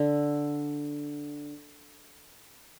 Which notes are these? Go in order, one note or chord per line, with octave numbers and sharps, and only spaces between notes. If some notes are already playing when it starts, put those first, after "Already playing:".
Already playing: D3